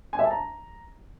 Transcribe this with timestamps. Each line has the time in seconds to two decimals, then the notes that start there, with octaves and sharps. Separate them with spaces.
0.13 G#5
0.19 E5
0.25 A5
0.31 A#5